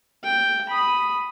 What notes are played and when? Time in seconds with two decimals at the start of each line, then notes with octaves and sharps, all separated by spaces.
0.24 G5
0.69 B5 D#6